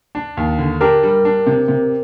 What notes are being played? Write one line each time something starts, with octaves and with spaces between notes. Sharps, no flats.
D4
D#2
D3
D4 G4 A#4
G3
D4
C3
C3